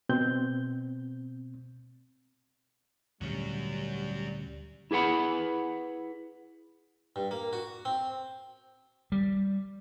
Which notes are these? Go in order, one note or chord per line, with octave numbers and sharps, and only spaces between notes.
B2 C4 G6
D2 A#2 D3 F#3 G3 C#4
E4 G#4 B4 F#5 B5
G2
A#3
F#4
C4
G3